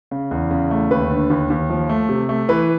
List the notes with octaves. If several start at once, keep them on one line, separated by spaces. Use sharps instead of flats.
C#3
E2
C#3
A3
D#2 B4
D3
D#2
D#2
F3
A3
C3
A3
E3 B4